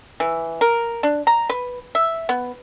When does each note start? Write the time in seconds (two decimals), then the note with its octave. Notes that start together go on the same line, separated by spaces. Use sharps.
0.20 E3
0.61 A#4
1.03 D4
1.27 A#5
1.49 B4
1.95 E5
2.29 B3